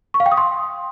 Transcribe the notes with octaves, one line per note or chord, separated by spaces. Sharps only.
C#6
F5
G5
D#6
C6